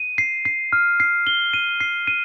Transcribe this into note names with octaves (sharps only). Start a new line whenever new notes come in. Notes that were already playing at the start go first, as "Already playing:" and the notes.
Already playing: D#7
C7
C7
F6
C7
G7
D#7
C7
D#7